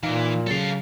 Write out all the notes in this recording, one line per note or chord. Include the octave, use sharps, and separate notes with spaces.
A#2 E3 D#4 F5
C#3 F#3 A4 F5